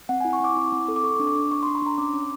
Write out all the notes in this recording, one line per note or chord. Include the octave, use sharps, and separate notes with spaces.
C4 F#5
E4 G#5
C#6
C4 D6
E4
C4
A4
D6
A4 C#6
D4
D6
D4
D4 C#6
D4 C6
B5
D4 A#5
C#4 D6
C#4